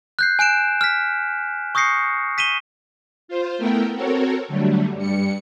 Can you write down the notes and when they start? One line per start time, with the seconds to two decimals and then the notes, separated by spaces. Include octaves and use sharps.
0.19 F#6 G6 C7
0.39 G#5 F#6 D7 E7
0.81 F6 B6
1.75 C#6 D#6 G6 A#6 C7 C#7
2.38 B6 D#7 E7 G7
3.28 F4 C5
3.58 A3 B3 E4 A#4 G5
3.94 C4 F#4 A4 A#4 C#5
4.48 D3 F#3 G3 A3
4.95 G2 G3 C#7